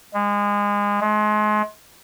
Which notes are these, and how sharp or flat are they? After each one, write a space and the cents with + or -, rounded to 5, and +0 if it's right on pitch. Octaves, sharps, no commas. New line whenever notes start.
G#3 -25
G#3 +35